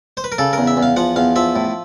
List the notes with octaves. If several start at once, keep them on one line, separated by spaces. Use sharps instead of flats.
C5
B4
A#4
C#3 A4
E2 A#4
E5
E2
F5
F3 F#5
E2 F5
F3 E5
A2